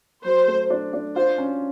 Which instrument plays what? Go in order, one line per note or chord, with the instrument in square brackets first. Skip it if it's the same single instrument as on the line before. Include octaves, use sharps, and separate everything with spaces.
[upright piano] F#3 [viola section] C5
[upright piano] A3
D4
D4
[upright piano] F4 [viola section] C5
[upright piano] C#4